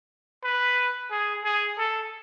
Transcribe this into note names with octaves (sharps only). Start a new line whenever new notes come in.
B4
G#4
G#4
A4